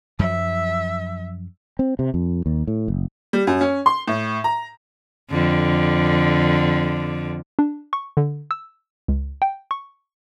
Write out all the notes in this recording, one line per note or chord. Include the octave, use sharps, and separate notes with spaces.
F#2 F3 F#3 E5
C4
C3
F2
D#2
A2
F#1
G3
F#2
C#4
C6
A2
A#5
F2 D3
D4
C#6
D3
E6
C#2
G5
C#6